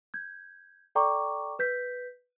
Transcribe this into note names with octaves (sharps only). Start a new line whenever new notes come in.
G6 G#6
A4 D5 G5 A#5 C#6 D6
B4 G6 B6